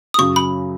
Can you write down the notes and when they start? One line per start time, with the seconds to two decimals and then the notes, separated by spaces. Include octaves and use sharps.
0.14 D#6
0.18 F#2 C#3 F#3 C#6
0.36 B5